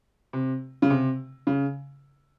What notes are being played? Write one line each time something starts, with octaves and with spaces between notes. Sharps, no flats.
C3
C#3
C3
C#3